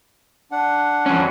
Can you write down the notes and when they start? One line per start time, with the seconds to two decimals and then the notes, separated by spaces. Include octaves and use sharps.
0.51 D4 F#5
1.06 F2 C#4